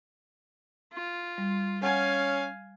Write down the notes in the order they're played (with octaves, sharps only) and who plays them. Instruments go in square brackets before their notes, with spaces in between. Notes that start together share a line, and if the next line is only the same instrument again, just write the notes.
[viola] F4
[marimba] G3
[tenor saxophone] C#4 [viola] F5 G#5 [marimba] F#5